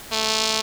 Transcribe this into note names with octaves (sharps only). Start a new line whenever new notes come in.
A3